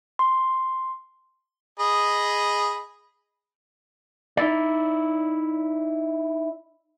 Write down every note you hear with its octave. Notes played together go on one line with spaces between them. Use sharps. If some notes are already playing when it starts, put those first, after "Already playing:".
C6
G#4 D#5 B5
D#4 E4 D5